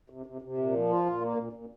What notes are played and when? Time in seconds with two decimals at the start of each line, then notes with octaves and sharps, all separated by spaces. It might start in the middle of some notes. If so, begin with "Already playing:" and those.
0.10 C3
0.26 C3
0.42 C3
0.58 A#2
0.74 F3
0.89 F4
1.06 A#2
1.21 A#3
1.37 A#2
1.53 A#2